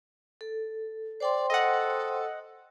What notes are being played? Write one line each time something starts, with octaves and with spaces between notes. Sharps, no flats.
A4
C5 D5 G5 C6
A4 D#5 F#5